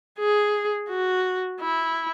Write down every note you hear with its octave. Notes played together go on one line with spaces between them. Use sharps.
G#4
F#4
E4